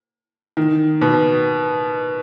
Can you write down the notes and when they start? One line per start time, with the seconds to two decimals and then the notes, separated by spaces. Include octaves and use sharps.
0.57 D#3
1.01 B2